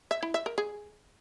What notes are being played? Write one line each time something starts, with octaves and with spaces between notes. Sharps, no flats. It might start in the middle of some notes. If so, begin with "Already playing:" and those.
E5
E4
E5
A#4
G#4